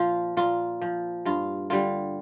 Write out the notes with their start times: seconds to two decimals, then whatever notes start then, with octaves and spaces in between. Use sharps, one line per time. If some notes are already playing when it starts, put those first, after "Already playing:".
Already playing: A#2 F3 F4
0.37 A#2 F4
0.82 F3
1.25 G2 F4
1.70 D3 G3 F4